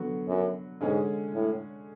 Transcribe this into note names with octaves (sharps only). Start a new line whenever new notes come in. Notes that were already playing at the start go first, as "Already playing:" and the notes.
Already playing: D3 F#3 B3 F#4
F#2
G#2 D3 G#3 C#4
A2